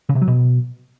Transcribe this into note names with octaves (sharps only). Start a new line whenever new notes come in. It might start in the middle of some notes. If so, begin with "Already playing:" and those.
C#3
C3
F#3
B2